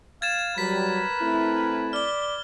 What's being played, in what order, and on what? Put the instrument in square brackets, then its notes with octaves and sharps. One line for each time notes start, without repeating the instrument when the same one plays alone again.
[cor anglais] F5 [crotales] G#6 A6 E7
[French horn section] F#3 G3 [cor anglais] A#4 [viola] B4 [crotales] B6
[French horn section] A3 C4 E4
[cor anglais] D5 [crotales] F6 G7